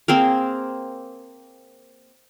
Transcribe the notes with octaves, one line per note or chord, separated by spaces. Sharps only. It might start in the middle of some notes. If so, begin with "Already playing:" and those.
A#3 C4 G#4 A#4